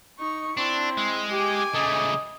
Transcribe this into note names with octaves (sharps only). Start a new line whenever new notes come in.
D#4 C#6
C4 D4 E4
G#3
G4 G#5 D6
C#3 A3 D#5